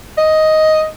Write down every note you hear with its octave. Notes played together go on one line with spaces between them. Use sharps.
D#5